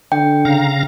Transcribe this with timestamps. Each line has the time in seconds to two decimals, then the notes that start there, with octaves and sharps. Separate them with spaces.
0.12 D3 G5
0.45 C#3 F5 A#5